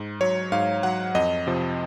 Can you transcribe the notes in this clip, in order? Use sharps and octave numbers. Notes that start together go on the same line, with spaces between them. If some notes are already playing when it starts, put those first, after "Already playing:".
Already playing: G#2
F#3 C#5
G#2 F5
F#3 F#5
F2 D#5
C3 F3